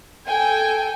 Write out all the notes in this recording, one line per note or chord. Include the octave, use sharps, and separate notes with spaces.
A4 G5 G#5